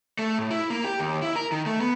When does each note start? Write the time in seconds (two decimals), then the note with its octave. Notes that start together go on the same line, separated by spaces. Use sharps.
0.19 A3
0.38 A2
0.51 E4
0.70 A#3
0.85 G4
1.00 D#2
1.22 E4
1.36 A#4
1.52 D#3
1.66 A3
1.81 B3